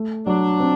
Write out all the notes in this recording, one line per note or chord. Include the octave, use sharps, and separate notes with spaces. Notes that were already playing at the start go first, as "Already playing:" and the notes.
Already playing: A3
F#3 D4
C4